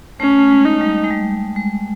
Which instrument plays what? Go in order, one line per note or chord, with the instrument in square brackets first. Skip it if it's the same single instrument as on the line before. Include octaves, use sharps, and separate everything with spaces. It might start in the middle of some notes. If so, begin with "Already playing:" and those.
[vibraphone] A3 [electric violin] C#4
[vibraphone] A3
G#3
[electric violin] D#4
[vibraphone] G3
G#3
G3
G#3